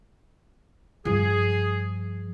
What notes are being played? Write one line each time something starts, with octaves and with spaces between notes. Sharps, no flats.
G2 F3 G#4